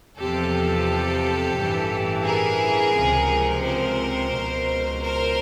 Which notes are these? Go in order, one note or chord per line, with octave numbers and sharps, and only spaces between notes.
E2 C3 F3 G4 A4
A1 G2 E3
G#4 A#4
C#2 C3 F3
A#4 C5
C#2 B2
A#4 C5